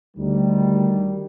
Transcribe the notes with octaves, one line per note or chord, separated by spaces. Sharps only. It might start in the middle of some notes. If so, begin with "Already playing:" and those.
D2 D#3 G3